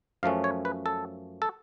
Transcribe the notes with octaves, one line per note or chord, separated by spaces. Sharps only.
F#2 F3 A3 C#4 F5
C#5
B4
A4
A4